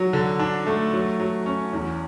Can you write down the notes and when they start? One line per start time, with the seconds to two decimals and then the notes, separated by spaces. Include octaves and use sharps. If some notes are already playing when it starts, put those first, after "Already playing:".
Already playing: F#3
0.13 D3
0.39 D4
0.66 A3
0.93 F#3
1.20 F#3
1.46 C#4
1.73 E2